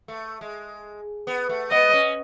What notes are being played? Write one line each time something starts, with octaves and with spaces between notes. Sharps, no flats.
A3
G#3
B3
A3
B3 D#5
C#4